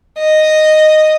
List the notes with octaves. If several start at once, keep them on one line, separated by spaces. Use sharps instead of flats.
D#5